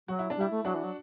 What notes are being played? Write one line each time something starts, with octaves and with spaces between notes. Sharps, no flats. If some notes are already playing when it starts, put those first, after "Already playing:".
F#3 F#4
E4
D4
G3 E4
A3
F#3 D4 F#4
E3
F#3